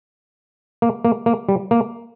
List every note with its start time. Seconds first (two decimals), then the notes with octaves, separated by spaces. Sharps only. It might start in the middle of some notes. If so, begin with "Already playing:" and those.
0.82 A#3
1.05 A#3
1.26 A#3
1.49 G3
1.71 A#3